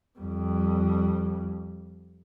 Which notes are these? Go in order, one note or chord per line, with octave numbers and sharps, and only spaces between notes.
F2 G3